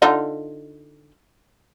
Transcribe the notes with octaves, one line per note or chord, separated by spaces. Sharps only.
D3 D#4 F4